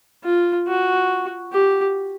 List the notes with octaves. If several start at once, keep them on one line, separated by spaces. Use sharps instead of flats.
F4
F#4
G4